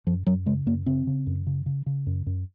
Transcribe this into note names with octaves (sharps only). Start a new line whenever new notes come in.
F#2 F3
F#2 F#3
C#3 G#3
F#2 A#3
C#3 C4
C#3
F#2
C#3
C#3
C#3
F#2
F#2